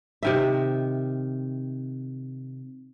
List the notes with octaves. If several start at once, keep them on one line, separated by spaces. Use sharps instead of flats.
C3 D#3 E5